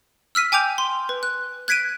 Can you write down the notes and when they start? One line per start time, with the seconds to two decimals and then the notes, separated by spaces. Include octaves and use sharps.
0.35 E6 F6 B6 D#7
0.52 G5 G#5 D6 G6 F7
0.78 C6
1.09 B4
1.23 F#6
1.68 F#6 G#6 B6 D7 D#7